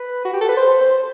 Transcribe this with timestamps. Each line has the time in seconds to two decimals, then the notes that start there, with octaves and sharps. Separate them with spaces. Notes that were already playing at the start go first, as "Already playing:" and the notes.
Already playing: B4
0.25 F#4
0.34 G4
0.41 A4
0.49 B4
0.57 C5
0.81 C5